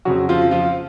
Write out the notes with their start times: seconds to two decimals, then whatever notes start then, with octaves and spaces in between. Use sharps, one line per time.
0.05 F2 C#3 F#3 F#4
0.29 F3 F4
0.51 F3 F4